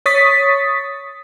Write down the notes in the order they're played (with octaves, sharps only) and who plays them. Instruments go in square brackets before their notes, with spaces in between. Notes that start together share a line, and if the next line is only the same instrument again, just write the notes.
[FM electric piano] C#5 C#6 D#6 A6 B6